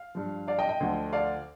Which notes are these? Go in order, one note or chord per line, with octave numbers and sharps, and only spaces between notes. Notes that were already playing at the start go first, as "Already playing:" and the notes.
Already playing: F5
G2 F3
D5 F5
D#5 G5
D#5 G5
D2 D3 F3
D5 F5